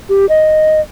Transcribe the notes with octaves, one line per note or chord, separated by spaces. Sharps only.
G4
D#5